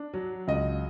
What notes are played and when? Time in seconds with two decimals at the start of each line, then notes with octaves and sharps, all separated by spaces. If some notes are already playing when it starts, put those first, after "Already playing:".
Already playing: D4
0.14 F#3
0.48 C#2 D#5